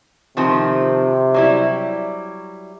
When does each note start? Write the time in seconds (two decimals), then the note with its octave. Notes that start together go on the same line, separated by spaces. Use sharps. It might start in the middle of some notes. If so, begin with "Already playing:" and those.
0.37 C3 D#3 F3 C4
1.34 F#3 G3 E4